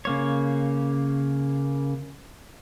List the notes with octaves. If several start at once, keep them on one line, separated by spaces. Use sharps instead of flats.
C#3 A#3 C#5